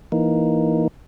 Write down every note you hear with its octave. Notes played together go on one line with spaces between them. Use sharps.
E3 A#3 D#4